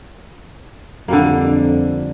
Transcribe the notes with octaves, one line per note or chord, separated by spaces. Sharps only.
F2 D3 G3 A#3